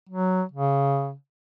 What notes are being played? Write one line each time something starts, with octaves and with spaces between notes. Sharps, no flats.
F#3
C#3